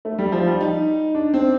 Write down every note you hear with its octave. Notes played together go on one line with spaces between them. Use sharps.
A3
G3
F3
G3
D#4
D4
C4